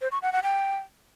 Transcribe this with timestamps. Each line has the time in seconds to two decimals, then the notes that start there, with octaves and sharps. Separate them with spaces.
0.01 C5
0.12 C#6
0.22 F#5
0.33 F#5
0.43 G5